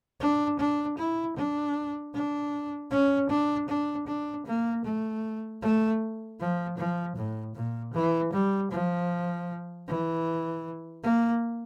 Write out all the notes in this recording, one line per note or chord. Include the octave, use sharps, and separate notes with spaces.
D4
D4
E4
D4
D4
C#4
D4
D4
D4
A#3
A3
A3
F3
F3
A2
A#2
E3
G3
F3
E3
A#3